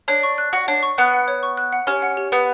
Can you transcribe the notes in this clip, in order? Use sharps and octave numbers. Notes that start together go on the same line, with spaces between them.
D4 C#5
C#6
F#6
F#4 F#5
D4 C#5
C#6
B3 F#6
F#5
C#5
C#6
F#6
F#5
C#4 G4
F#5
G4
B3 B4